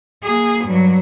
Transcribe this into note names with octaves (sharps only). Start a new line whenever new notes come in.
A#3 G#4
G2 F#3